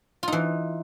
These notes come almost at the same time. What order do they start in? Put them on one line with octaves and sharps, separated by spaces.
F4 D#4 E3